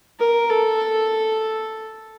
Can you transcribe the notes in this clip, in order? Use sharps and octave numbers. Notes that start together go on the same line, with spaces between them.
A#4
A4